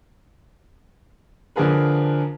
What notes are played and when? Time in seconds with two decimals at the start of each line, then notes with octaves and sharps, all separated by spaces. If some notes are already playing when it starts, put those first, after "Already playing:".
1.56 D3 F3 D4 G#4 A#4 B4